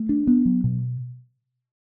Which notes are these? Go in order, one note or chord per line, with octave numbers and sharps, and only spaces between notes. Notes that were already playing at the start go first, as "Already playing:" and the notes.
Already playing: A3
D4
B3
F#3
B2